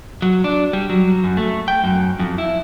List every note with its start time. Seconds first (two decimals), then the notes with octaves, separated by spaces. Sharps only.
0.22 F#3
0.44 D4
0.73 G3
0.90 F#3
1.24 F#2
1.37 A3
1.68 G5
1.84 F#2
2.19 F2
2.38 E4